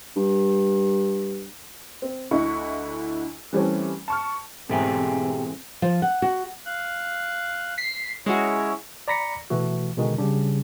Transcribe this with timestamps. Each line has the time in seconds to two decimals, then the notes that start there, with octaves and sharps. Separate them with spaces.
0.16 G2
2.02 C4
2.31 D2 D3 E4 D#5 C#6
3.53 E3 G3 A3 C4 C#4
4.08 A5 C#6 F6
4.69 G#2 B2 E3 A3 C4 G4 G#4
5.82 F3
6.02 F#5
6.22 F#4
6.65 F5 F#6
7.78 B6 C7
8.26 G#3 C#4 E4 F#4 C#5
9.08 D5 A#5 B5 A#6 B6 C#7
9.50 B2 E3 A3 F#4
9.97 B2 D3 D#3 G#3 F#4
10.18 C#3 G3 D4